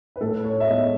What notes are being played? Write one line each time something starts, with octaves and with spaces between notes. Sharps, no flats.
B4
A2 A4
C#5
E5
G#3 B3 D#5